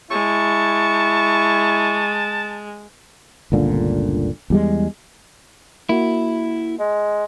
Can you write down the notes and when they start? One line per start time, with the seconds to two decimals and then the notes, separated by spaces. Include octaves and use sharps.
0.11 G#3 E4 A5 C#6
3.52 G1 C#2 A#2 D3
4.50 E2 G3 G#3
5.89 A#3 E4 F#4
6.79 G#3